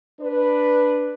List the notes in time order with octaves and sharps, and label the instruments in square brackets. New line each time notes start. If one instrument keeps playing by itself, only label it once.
[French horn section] D4 B4